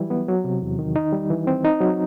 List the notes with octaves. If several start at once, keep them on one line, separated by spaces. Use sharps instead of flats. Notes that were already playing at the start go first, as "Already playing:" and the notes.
Already playing: E3 F#3 G3 E4
B3
F#3
C3
E2
D#3
D#4
G3
E3
C4
D#4
F#3